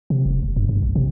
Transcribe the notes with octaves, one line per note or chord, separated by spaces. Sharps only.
C3
F1
F#1
G2
G2
A#1
C3